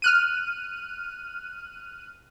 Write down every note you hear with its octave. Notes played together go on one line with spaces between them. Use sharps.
F6 F#6 D#7